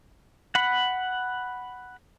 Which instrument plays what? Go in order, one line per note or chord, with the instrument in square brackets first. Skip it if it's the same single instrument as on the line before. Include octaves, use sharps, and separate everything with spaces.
[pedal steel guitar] F#5 B5